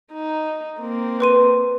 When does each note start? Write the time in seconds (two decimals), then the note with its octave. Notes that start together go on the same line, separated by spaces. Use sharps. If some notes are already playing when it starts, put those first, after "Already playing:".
0.12 D#4
0.80 A#3 C4
1.20 B4 C6 D#7